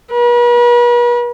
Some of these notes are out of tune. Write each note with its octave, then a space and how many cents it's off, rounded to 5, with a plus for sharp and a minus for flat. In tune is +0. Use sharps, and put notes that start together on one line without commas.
B4 -45